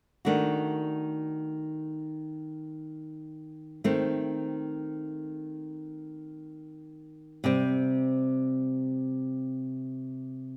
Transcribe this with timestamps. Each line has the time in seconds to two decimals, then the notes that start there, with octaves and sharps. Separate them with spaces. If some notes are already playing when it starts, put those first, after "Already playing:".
0.25 D#3 A3 D4 F#4
3.84 D#3 A3 C4
7.44 C3 G3 C4